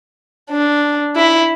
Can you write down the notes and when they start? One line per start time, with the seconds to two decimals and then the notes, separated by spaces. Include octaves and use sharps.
0.51 D4
1.16 E4